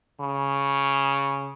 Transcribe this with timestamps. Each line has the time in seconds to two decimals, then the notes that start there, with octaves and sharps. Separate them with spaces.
0.20 C#3